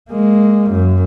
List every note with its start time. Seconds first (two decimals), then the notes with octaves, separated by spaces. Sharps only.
0.10 G#3 A#3
0.71 F#2